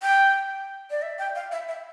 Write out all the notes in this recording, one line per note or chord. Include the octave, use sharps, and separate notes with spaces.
G5
D5
E5
G5
F5
E5
E5